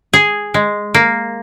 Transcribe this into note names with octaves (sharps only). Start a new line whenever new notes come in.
G#4
G#3
A#3